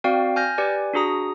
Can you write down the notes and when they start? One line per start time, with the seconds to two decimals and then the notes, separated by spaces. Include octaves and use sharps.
0.04 C4 F#4 D5 F5 G5
0.36 G#5 F6 G6 A#6
0.58 G4 B4 D5 G#5
0.93 D4 F#4 G#4 A#5 D#6